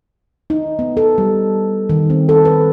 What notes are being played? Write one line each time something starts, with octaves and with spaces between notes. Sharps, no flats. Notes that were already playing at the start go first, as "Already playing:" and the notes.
D#4
B3
A4
G3
D#3
C4
A4
B4